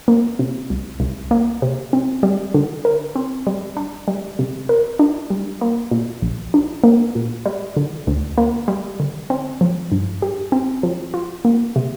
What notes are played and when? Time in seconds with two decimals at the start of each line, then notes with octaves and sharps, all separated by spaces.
0.08 A#3
0.39 C3
0.70 C2
1.00 C2
1.31 A#3
1.62 C3
1.93 C4
2.23 G3
2.54 D3
2.85 A#4
3.16 C4
3.47 G3
3.77 D4
4.08 G3
4.39 C3
4.69 A#4
4.99 D4
5.30 G3
5.61 A#3
5.91 A#2
6.22 A#1
6.54 D4
6.84 A#3
7.15 A#2
7.46 G3
7.77 D3
8.07 D2
8.38 A#3
8.68 G3
9.00 D3
9.30 C4
9.61 F3
9.92 G2
10.22 G4
10.52 C4
10.83 F3
11.14 F4
11.45 A#3
11.76 C3